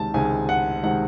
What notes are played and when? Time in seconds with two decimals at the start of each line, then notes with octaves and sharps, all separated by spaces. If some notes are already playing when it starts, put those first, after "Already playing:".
Already playing: C#2 C3 D#3 G#3 A5
0.14 C#2 C3 D#3 G#3 G#5
0.49 F#5
0.83 C3 D#3 G#3 F#5